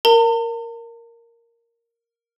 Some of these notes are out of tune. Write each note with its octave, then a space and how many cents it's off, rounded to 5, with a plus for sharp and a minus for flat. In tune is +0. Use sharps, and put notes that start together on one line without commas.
A#4 -5 A5 +45